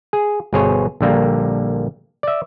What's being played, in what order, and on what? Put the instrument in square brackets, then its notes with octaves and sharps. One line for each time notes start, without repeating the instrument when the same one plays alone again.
[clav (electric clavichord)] G#4
G1 B2 G#4 C5 C#5
A#1 D3 G3 A#3
D5 E5